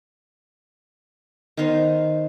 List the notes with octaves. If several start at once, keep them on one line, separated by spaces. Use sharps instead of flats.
D#3 B3 D#4 C5